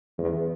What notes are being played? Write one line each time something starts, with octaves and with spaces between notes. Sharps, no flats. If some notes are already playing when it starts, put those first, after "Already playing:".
E2